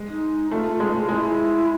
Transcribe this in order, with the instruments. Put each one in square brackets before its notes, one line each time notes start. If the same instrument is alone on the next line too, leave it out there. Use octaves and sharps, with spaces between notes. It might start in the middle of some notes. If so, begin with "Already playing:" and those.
Already playing: [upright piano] G#3
[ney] D#4
[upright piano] A3 [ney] F4
[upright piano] G#3
[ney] F4
[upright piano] G#3 [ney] E4